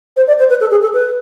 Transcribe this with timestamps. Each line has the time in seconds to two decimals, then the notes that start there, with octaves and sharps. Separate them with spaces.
0.16 C5
0.27 D5
0.39 C5
0.49 B4
0.60 A4
0.71 G#4
0.82 A4
0.93 B4